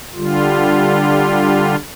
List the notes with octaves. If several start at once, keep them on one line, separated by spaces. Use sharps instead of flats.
D3 G3 F4